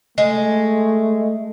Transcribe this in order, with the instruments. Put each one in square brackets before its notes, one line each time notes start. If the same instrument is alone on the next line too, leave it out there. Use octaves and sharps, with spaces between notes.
[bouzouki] G#3 [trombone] A3